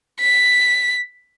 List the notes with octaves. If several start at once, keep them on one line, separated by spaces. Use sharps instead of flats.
B6